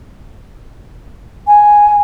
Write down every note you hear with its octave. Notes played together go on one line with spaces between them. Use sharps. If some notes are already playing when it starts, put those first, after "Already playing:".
G#5